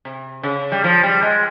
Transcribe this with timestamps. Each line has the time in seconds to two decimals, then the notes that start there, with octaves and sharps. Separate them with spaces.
0.05 C3
0.43 C#3
0.72 G3
0.84 F3
1.03 G3
1.22 G#3